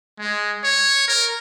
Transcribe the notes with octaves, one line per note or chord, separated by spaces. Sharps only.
G#3
C#5
A#4